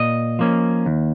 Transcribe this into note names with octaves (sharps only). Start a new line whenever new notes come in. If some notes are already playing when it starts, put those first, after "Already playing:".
Already playing: A#2 D#5
F3 A#3 C#4
D#2